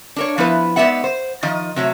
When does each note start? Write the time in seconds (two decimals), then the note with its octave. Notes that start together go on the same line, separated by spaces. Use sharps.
0.16 D4 A#4 C#5
0.38 F3 B3 E4 B4
0.76 G#2 B3 A#4 D5 E5 F#5
1.04 C5
1.43 D#3 F3 D#5
1.76 C3 F#3 A3